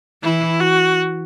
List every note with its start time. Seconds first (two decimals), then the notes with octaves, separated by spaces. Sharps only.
0.23 E3 E4
0.60 F#4